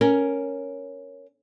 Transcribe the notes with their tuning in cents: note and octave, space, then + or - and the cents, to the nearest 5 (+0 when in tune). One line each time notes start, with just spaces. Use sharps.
C#4 +0 A#4 +5